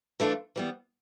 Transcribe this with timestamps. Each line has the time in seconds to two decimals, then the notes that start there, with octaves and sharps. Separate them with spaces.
0.20 E3 A3 D4 F4
0.56 E3 G3 B3